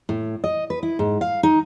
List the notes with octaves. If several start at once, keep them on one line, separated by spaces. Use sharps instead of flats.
A2
D#5
B4
E4
G#2
F5
D#4